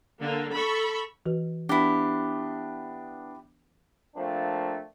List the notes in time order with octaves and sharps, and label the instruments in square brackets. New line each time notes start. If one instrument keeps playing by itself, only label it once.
[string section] D3 A#3
A4 B5 C#6
[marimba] E3 F#4 B4
[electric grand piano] B3 D4 [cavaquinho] E4 G4
[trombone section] F3 A3 A#3 C4 D4